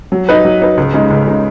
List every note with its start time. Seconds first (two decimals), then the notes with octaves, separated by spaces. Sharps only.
0.12 F#3
0.29 D#4 B4
0.45 F#3
0.62 D#4 B4
0.77 C#2
0.93 C#3 G#3 D#4
1.10 C#2
1.27 C#3 G#3 D#4